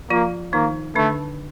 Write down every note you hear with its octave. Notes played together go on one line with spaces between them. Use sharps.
F3 A#3 F4
D#3 A#3 D#4
D3 A3 D4